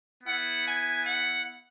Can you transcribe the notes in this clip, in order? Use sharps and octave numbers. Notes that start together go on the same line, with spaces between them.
B3 E4 F#5
G#5
F#5